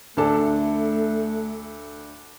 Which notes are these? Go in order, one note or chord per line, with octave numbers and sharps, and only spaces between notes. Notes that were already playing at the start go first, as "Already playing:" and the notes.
D2 A3 D4 A4